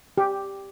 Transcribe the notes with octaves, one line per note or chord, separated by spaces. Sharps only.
G4